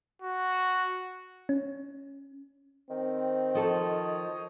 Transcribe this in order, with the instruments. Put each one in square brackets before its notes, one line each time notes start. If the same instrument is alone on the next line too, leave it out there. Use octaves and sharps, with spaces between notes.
[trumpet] F#4
[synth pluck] C#4
[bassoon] D#3 [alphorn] C4
[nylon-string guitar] F3 A4 [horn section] C5 C#5 D#5